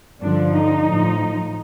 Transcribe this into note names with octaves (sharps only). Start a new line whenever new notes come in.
G2 D3 F3 D4
D#4
A2 F3